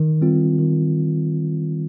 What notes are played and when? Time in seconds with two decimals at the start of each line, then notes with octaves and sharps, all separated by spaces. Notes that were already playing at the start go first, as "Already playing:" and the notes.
Already playing: D#3
0.21 G3 C4 F4
0.59 D#3